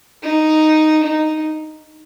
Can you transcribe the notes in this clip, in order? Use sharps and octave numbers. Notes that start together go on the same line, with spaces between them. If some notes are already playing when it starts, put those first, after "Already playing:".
D#4
D#4